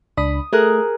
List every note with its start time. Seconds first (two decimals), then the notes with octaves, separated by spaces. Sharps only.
0.17 C#2 D4 B5 D#6
0.53 A3 G#4 A#4 F#6